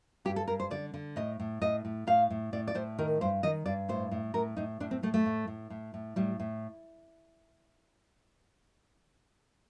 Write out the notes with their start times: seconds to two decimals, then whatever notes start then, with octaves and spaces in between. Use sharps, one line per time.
0.25 G2 G4
0.36 A4
0.48 G2 A#4
0.60 C5
0.71 D3 D5
0.94 D3
1.16 A2 D#5
1.40 A2
1.61 A2 D#5
1.85 A2
2.07 A2 F5
2.30 A2
2.53 A2 D5
2.68 D5
2.75 A2 C5
2.99 D#3 A#4
3.21 G2 C5
3.43 D#3 D#5
3.66 G2 D5
3.89 A2 C5
4.11 A2
4.34 A2 A#4
4.57 A2 D#4
4.80 A2 D4
4.91 C4
5.03 A2 A3
5.14 A3
5.26 A2
5.47 A2
5.70 A2
5.94 A2
6.16 A2 G3
6.40 A2